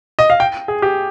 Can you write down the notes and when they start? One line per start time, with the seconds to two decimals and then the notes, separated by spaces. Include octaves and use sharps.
0.19 D#5
0.30 F5
0.40 G5
0.68 G#4
0.82 G4